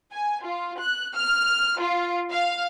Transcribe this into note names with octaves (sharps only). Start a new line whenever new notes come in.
G#5
F4
F#6
F6
F4
F5